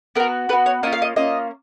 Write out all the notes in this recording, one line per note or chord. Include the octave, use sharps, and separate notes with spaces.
B3 F#4 A#4
B3 F#4 B4
C#5
A#3 C#4 F4 D#5
F5
D#5
A#3 C#4 F4 D#5